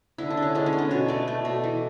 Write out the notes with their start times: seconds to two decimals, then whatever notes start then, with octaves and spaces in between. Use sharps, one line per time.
0.18 D3 E4
0.30 D4
0.37 D3
0.42 C#4
0.55 G#3 C#4
0.66 C#4
0.73 B3
0.78 D4
0.91 B2 C#5
1.08 A3 D5
1.28 A3
1.45 B2
1.64 E3